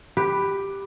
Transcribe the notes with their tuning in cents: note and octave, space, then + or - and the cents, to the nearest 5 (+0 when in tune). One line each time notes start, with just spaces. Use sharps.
G4 +5 B4 +5